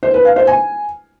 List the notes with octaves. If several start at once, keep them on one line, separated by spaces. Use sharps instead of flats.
C5
B4
F5
C5
G#5